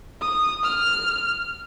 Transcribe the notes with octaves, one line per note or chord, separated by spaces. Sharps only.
D#6
F6